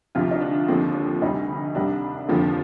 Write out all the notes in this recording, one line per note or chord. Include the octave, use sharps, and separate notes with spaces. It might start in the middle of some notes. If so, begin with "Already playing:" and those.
D2 C3 F3 F4
D#4
D4
D#2 D3 F3 C4
D4
D2 C3 G3 D#4
C2 C3 D#3 G3 D4
F1 D#2 D3 F3 C4